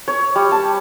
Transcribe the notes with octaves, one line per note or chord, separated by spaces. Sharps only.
C#5
G3
A5